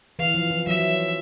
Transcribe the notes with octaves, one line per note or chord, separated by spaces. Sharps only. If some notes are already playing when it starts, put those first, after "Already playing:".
E3 F5
F3
F3
F#3 E5